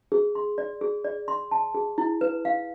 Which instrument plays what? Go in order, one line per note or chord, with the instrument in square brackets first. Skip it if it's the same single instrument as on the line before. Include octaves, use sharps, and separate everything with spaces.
[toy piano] G#4
C6
D5
G#4
D5
C6
A5
G#4
E4
B4
F5